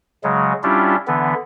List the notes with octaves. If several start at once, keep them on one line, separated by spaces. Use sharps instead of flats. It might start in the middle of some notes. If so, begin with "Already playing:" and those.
C#3 F#3 G#3
G3 C#4 D4 E4 F4 G4
D3 E3 B3